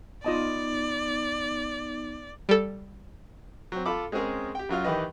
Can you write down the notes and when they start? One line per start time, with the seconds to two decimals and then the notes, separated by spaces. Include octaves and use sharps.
0.25 B3 D#4 F4 D5 D#5 A5
2.49 G3 A4
3.72 F#3 C4
3.86 F4 A4 B5 D6
4.12 G#3 C4 C#4 G#4 A#4
4.55 G4 G5
4.69 F#2 F#3 F4 F6
4.84 D#3 E3 G4 B4 D#5